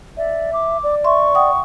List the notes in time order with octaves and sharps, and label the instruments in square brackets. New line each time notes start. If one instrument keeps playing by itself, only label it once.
[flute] D5 [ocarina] E5
[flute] D6
[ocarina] D5
[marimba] E5 C6 [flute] C#6
[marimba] F#5 G5 D#6